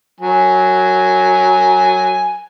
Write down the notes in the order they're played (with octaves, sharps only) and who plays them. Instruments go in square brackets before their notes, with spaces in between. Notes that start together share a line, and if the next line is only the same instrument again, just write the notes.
[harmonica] F#3 G#5